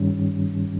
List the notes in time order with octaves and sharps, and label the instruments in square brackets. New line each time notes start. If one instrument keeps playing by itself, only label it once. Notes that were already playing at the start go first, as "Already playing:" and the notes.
Already playing: [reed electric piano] G2 D#3 G3 C#4